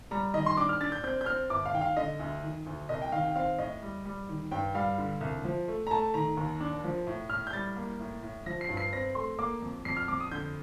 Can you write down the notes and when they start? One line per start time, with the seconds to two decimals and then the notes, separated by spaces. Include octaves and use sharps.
0.11 G3 A#5
0.34 D#3 D#5
0.46 C6
0.57 D4 D6
0.69 F6
0.81 D4 A6
0.92 G6
1.03 C4 G6
1.21 G6
1.26 C4 F6
1.50 G1 D6
1.66 F5
1.73 D#3 G5
1.81 F5
1.96 D3 D#5
2.19 D2
2.43 D#3
2.66 D2
2.89 C2 D#5
3.02 G5
3.12 D#3 F5
3.25 G5
3.35 C4 F5
3.59 A2 D#5
3.82 G3
4.05 G3
4.29 D#3
4.51 G2 G5
4.75 G3 F5
4.98 D3
5.21 C2
5.45 F3
5.68 A3
5.87 A#5
5.91 A3 A5
6.14 D#3 A#5
6.37 D#2
6.61 D4
6.84 F3
7.07 A2
7.30 A2 F6
7.47 G6
7.53 G3 A6
7.77 A#3
7.99 A2
8.23 A2
8.46 F3 A#6
8.61 C7
8.69 G2
8.77 C7
8.93 C4 A#6
9.15 A3 C6
9.39 A#3 D6
9.62 F2
9.85 F2 C7
9.97 F6
10.08 F2 D6
10.20 D#6
10.31 D3 G6